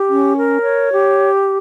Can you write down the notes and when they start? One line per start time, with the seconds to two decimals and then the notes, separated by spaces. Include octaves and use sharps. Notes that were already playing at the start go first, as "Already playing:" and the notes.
Already playing: G4
0.09 C#4
0.37 A#4
0.64 C#5
0.92 G4